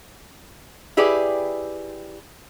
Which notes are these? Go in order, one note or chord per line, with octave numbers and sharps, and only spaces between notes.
E4 G4 G#4 B4 D5